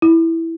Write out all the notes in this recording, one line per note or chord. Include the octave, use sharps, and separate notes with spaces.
E4